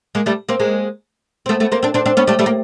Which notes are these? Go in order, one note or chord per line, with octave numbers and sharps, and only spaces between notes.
G#3 A#3
G3 A3
A#3 C4
G#3 A#3
C4
A3 B3
A3 B3
A#3 C4
C4 D4
C4 D4
C4 D4
B3 C#4
G3 A3
G3 A3
A#3